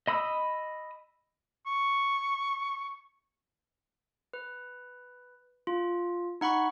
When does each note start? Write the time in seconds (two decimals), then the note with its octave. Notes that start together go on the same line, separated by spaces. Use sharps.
0.07 D#5 B5 D#6 E6
1.66 C#6
4.33 B4
5.67 F4
6.41 D#4 F#5 B5 C#6